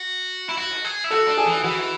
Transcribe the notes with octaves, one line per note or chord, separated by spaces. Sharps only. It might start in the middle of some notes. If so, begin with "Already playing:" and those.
Already playing: F#4
E4
F#4
G#4
E4
F#4 A4
D4
G#4
E3
G#4
E3 F#4